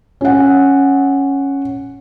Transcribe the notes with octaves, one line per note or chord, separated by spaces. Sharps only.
C#4 F#5